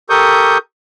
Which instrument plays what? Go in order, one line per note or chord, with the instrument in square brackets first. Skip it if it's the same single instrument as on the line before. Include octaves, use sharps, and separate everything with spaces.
[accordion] G4 A4 A#4 C#6 D#6 G6